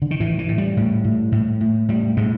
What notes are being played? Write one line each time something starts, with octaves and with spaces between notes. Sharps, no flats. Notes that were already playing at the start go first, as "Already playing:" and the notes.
D3
D#3
A2 E3
E3
A2
G3
A2
A2
A2
A2
A2 G3
A2 G#3